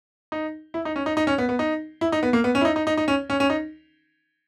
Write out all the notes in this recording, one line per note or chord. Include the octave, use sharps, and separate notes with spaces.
D#4
E4
D#4
C#4
D#4
D#4
C#4
B3
B3
D#4
E4
D#4
B3
A#3
B3
C#4
E4
D#4
D#4
D#4
D#4
C#4
C#4
C#4
D#4